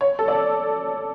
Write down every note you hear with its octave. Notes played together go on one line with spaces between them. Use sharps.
C#5
A4
D5